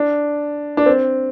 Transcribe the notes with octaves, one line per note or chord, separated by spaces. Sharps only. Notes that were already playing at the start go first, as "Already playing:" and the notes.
Already playing: D4
D4
C4